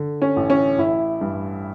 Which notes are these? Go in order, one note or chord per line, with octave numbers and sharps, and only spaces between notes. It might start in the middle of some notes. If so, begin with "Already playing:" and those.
Already playing: D3
C#4
A1
C#4
A1 E4
G2